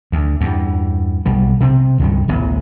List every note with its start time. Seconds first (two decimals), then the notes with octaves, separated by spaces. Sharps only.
0.12 D2
0.41 E2 G2
1.26 B1 B2 G3
1.60 C3 C4
2.00 C#2 G2 D#3 G3
2.28 D1 A1 B3